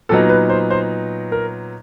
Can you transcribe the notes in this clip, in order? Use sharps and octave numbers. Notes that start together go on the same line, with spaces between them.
A#2 F#3 B3 D#4 A4
B4
C5
C5
A#4